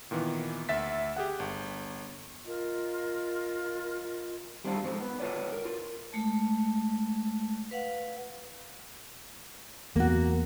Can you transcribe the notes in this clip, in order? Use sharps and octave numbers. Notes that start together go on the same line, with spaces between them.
A#2 D#3 E3 B3
D2 E5 A6 B6
G4 G#4 F#5
G1
F4 A#4 D#5
G3 C4 D4 F4
G#2 F3 C4
B3
F4 F#4 B4 C#5 D5
A#4
F4
G#3 A3 A5
B4 F5 F#5
E2 A#3 F#4